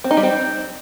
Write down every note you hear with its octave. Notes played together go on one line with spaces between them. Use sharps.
C4
D#4
G3
C4